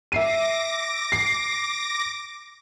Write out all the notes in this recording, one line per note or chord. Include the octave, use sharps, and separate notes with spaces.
E5 D6 A#6 C7 D#7
C7